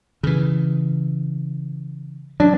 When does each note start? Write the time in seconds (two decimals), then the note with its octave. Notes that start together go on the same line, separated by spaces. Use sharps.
0.23 C#3 E3
2.40 F#3 D4